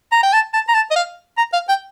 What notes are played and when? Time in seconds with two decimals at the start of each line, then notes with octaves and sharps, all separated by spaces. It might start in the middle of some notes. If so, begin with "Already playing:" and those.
0.12 A#5
0.23 G5
0.33 A5
0.53 A5
0.68 A#5
0.74 A5
0.91 D#5
0.96 F5
1.37 A#5
1.53 F5
1.69 G5